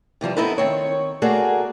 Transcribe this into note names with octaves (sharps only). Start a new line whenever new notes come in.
C3 E3 F3 G3
B3 C4 D#4 E4 A4 B4
D#3 C4 C#5
A3 A#3 F#4 G#4 D5